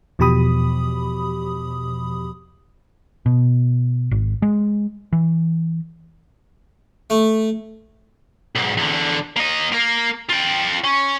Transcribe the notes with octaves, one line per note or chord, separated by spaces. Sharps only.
E2 B2 F3 G4 B5 D#6
B2
G#1
G#3
E3
A3
B1 G#2
E2 D3
A#3 D#5
A#3 A#4
F4 G5
C#4